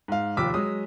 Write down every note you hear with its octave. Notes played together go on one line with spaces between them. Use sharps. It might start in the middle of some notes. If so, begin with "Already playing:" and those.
G#2 F5
F1 D#2 F4 D6 E6 B6
F#3 G#3 D#6